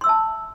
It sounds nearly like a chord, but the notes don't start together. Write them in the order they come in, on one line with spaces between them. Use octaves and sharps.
C6 E6 E5 A5